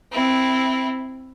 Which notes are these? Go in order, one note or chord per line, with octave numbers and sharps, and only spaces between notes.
C4 E4